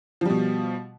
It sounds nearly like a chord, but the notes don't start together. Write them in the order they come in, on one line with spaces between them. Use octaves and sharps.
F3 G3 B2